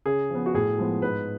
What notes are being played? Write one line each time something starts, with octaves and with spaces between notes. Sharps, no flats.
C#3 G#4
F3
B3
F#4
A2 G#4
F3 G#3 B3
G#2 B4